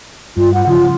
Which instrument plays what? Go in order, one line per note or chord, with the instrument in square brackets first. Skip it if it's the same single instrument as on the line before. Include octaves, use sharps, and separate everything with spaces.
[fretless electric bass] G2 [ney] F4
[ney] F#5
[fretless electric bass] C#3 F3 [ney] F4